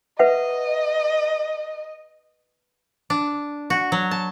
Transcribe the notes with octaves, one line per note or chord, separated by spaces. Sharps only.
B4 D#5 E5 F#5
D4
F#4
F#3
A5